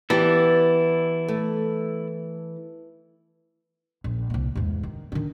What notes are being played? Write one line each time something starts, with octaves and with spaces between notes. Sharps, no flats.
E3 B3 E4 G4 D5 A5
A3
A#1
C2 A#2
E2 G#2
D#3
D#3 D4